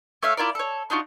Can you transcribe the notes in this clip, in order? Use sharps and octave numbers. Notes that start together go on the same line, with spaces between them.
A3 C#5 E5 F5
E4 F4 A#4 D5
A4 C#5
D4 D#4 F4 F#4